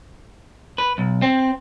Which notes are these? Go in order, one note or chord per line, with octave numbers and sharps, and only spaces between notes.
B4
B1
C4